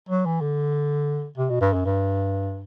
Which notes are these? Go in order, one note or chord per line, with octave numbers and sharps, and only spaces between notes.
F#3
E3
D3
C3
B2
G2
F#2
G2